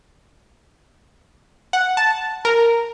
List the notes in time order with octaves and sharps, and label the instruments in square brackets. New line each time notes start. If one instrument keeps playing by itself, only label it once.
[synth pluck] F#5
A5
A#4